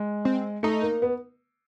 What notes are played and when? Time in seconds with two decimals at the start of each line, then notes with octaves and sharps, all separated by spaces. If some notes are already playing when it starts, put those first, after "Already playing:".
Already playing: G#3
0.25 C4
0.63 A3 D#4
0.82 A#3
1.02 B3